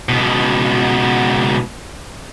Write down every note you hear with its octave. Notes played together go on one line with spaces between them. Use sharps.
C#2 B2